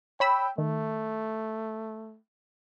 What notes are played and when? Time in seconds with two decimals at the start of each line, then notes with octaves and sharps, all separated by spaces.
0.20 C#5 G5 B5 E6
0.58 D#3 A3